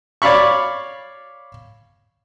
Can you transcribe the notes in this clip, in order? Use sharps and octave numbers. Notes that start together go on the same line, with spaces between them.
C#5 D5 F5 B5 C#6